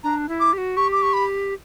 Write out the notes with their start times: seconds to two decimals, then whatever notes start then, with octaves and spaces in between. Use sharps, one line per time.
0.04 D4 A#5
0.29 E4
0.40 D6
0.53 G4
0.58 F#4
0.77 G4 C#6
0.92 D6
1.02 C#6
1.13 B5